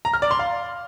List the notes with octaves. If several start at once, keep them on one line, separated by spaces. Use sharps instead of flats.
A#5
F6
D5
C6
F5